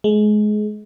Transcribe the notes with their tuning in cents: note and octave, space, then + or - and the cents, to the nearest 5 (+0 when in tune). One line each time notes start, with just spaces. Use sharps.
G#3 +25